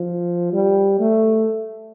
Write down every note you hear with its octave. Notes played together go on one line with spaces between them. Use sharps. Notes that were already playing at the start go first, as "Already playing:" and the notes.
Already playing: F3
G3
A3